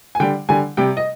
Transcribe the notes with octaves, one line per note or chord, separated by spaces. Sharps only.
G#5
D3 G3 G5
D3 G3 G#5
C3 G3 G5
D#5